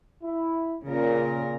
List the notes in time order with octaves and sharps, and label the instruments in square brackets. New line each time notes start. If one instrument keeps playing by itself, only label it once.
[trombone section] E4
[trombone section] A#2 [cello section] C#3 A#4